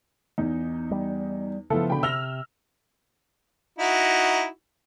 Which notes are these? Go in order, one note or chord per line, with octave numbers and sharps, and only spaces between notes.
E2 D#4
G3
C#3 F3 B3 E4 A4
B2 D3 G5 B5
C3 E6 F6 A#6 F7 G7
D#4 E4 F#4